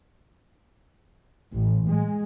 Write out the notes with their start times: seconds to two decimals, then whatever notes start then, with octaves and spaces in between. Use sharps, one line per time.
1.53 A1
1.89 G#3